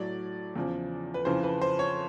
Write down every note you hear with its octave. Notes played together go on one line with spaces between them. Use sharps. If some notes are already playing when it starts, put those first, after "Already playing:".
Already playing: A2 F#3 D5
E2 C#3 F3
B4
F2 C#3 E3 C5
B4
C5
C#5